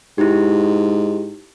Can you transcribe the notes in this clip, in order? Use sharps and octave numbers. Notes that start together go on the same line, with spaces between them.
G#2 E4 G4